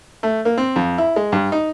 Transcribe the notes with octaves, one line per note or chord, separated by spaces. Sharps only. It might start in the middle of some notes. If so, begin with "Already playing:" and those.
A3
A#3
C4
F2
E4
G#3
G2
D#4